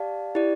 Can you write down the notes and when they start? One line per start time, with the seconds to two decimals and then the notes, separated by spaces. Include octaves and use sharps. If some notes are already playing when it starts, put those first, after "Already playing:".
Already playing: G4 D5 F5 A5
0.35 E4 G4 D5